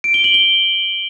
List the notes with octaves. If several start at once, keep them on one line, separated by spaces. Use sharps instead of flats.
D7
G7
F#7
G7